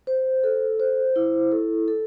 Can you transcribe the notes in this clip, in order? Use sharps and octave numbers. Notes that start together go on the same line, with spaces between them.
C5
A4
C5
E4
A4
A4